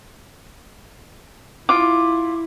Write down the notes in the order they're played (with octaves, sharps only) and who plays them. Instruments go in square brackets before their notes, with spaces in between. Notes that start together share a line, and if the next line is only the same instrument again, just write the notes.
[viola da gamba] E4 [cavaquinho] F4 D6